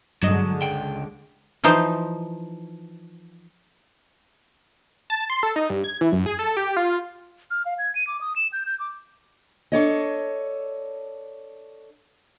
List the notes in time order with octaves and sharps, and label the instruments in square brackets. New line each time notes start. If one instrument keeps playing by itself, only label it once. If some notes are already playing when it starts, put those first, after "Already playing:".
[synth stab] G2 D#5 [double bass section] D3 G#3 [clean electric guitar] F#3
[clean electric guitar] C#2 G5
[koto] E3 F3 D#4 C5
[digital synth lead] A5
C6
A4
D#4
G2
G#6
E3
F#2
G#4
A4
G4
F4
[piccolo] F6
F5
G#6
D#7
D6
D#6
E7
G6
G6
D6
[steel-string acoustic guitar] D4 A4 C#5 D#5